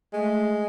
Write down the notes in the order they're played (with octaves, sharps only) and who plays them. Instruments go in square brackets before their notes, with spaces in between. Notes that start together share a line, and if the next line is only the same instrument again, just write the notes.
[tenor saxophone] G#3 [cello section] A3